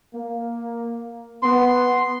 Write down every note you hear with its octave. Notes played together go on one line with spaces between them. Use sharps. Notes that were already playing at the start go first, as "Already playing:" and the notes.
A#3
B3 C6